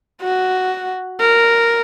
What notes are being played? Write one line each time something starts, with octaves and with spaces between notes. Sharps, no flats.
F#4
A#4